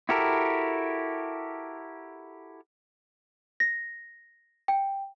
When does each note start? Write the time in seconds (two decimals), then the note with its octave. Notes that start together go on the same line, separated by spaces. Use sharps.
0.09 E4 F#4 G4 A4 A#4
3.60 A#6
4.68 G5